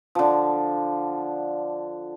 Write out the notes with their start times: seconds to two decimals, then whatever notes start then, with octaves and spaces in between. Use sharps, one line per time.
0.15 D3 F3